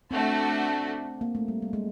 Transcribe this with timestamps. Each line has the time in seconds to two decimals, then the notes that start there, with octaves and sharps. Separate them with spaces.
0.11 A3 C4 D4 F#4
1.21 A#3
1.35 A3
1.48 G3
1.62 G3
1.73 G#3